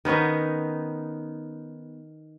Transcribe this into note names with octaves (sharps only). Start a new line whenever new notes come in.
D#3 B3 C#4 D#4